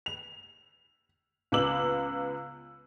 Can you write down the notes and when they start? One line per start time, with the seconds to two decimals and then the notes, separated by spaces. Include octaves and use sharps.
0.06 F7
1.52 C#2 B3 D6 E6 F#7